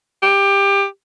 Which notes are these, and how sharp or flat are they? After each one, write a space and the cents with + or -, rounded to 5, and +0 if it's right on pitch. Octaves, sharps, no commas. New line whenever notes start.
G4 +20